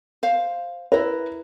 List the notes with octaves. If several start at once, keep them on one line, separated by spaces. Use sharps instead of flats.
C5 F5
E4 A#4 B4